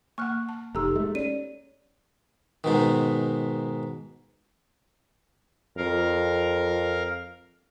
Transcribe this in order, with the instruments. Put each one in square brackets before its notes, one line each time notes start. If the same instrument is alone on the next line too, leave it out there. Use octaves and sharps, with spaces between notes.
[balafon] A#3 F#5 [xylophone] C#6 F6 F#6
[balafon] A5
[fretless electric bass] F1 [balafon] D#4 G4 [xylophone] A4 A#5 E6
[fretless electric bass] G#3 A3
[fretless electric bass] C#4 [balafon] D5 [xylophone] D#7
[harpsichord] G#2 B2 D#3
[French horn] F2 [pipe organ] A#4 F5